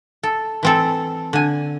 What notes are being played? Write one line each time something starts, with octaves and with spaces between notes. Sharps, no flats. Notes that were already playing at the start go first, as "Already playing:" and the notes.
A4
E3 C4 A4
D3 G#5